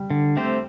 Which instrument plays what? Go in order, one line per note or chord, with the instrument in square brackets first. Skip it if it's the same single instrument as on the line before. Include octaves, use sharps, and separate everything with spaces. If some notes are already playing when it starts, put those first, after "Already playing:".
Already playing: [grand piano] G3
[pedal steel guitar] D3
A3 C4 G4 C5